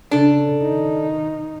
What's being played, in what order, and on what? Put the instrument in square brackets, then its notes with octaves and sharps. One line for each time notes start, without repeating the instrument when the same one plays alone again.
[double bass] C#3 [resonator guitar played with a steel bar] D4 A4
[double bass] D#3 D#4